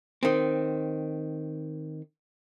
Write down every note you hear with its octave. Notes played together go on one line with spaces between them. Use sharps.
D#3 C4